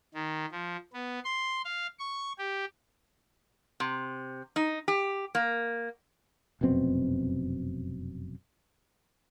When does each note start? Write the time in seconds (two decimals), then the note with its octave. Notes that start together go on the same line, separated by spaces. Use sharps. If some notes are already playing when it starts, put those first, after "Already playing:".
0.14 D#3
0.52 F3
0.93 B3
1.24 C6
1.65 F5
1.99 C#6
2.38 G4
3.80 C3
4.56 D#4
4.88 G4
5.35 A#3
6.61 F1 F#2 B2 C4